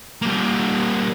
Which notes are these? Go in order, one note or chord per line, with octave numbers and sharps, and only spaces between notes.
G3 A#3